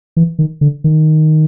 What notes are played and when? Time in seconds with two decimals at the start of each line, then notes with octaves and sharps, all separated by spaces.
0.17 E3
0.39 D#3
0.61 D3
0.84 D#3